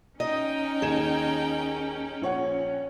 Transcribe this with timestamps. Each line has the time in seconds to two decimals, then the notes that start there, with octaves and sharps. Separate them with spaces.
0.20 C#4 D#4 D#5 G5
0.82 D#2 G#4 E7
2.22 A#1 C#5 F#5